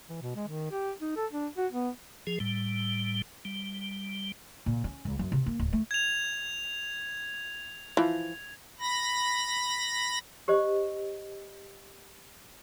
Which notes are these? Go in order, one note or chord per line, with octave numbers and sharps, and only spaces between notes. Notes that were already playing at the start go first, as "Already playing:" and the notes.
E3
B2
G#3
D#3
G4
D#4
A4
D4
F#4
B3
F3 G#4
A2 G3
G3
A#2
C#4
C#2
F#2
C3
A#3
D1
A3
G#6 F7
E3 F3
B5 A#6
G4 C5 D#5